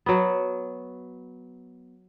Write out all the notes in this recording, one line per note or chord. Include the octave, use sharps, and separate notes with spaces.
F#3 B3